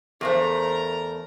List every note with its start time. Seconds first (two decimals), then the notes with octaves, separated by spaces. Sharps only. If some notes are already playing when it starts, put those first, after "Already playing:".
0.21 E2 C#3 A3 G#4 A#4 C5 A#5